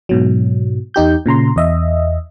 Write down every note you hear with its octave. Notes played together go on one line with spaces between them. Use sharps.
G#2 B2 F#3
E2 D#4 G4 G6
A#2 C#3 A#5 C6
E2 D#5 E5